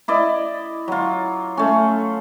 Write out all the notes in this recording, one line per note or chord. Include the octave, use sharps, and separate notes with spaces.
E4 D5 D#5
F#3 F4
A3 C#4